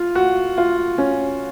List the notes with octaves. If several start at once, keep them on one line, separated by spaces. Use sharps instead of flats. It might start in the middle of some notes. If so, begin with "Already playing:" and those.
Already playing: F4
F#4
F4
C#4